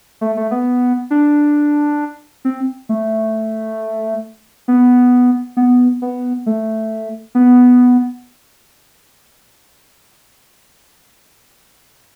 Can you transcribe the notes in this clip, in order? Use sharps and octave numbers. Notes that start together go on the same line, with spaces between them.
A3
A3
B3
D4
C4
A3
B3
B3
B3
A3
B3